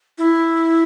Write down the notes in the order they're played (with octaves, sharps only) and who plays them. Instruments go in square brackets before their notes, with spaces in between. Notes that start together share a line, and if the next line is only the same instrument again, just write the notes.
[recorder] E4